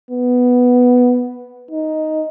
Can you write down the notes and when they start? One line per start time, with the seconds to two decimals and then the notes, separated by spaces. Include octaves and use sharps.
0.11 B3
1.71 D#4